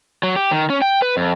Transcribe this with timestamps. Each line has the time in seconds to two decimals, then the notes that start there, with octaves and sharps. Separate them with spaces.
0.23 F#3
0.36 G4
0.51 D#3
0.70 C#4
0.82 G5
1.02 B4
1.17 F2